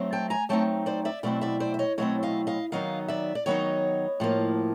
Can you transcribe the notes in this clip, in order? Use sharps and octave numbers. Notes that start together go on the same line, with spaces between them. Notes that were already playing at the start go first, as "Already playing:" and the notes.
Already playing: F#3 A3 C4 D#4
G5 A5
G#5 A#5
F#3 A3 C4 D#4 G5 A5
C5 D5
D5 E5
B2 F#3 A3 C4 E4 D5 E5
D5 E5
C5 D5
E5
C#5 D#5
B2 F#3 A3 C4 E4 C#5 D#5
D#5 F5
D#5 F5
D#3 F#3 B3 D#4 D#5 F5
D5 E5
D5
D#3 F#3 B3 D#4 C#5 D#5
A2 F3 A#3